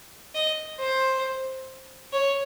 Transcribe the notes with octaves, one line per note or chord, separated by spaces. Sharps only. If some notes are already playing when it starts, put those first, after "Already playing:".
D#5
C5
C#5